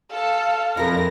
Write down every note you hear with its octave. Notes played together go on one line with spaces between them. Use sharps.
A4 F5
F2 E4 A#4 A#6